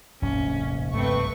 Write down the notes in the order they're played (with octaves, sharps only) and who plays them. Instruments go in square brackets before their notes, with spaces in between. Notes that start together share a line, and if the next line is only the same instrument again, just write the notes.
[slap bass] F1 A#1 D#2 [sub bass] G#2 [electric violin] C#4
[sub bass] G2 [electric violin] A3 C4 [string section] B4 C#6